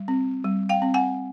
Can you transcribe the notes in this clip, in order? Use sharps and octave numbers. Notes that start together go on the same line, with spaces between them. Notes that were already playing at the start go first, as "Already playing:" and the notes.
Already playing: G3
C4
G3
F5 G5
C4
F#5 G#5